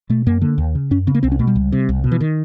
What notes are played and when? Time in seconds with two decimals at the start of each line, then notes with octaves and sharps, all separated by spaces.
0.10 B2 A3
0.26 F#2 A#3
0.41 D3 A#3
0.58 D#2
0.75 C#3
0.91 F#2 C#4
1.07 C#3 C4
1.15 A#3
1.23 C2 C4
1.32 C#4
1.39 B2 A3
1.47 G3
1.55 C#2
1.72 C3
1.89 C2
2.04 B2
2.12 E3
2.21 D#3